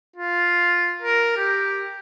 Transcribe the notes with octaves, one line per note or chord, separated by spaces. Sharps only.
F4
A#4
G4